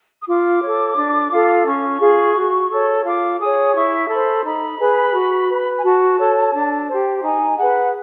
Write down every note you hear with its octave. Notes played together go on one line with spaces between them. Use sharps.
D#6
F4 D6
A4 C#5
D4
F4 A4
C#4 C#6
F4 G#4
F#4
A4 C#5
F4 D6
G#4 C#5 D#6
E4 C#6
A4 C5 B5
D#4 B5
G#4 B4
F#4
B4
G#5
F#4 A5
A4 C#5
D4
G4 C5
D#4 G#5
G#4 B4 F#5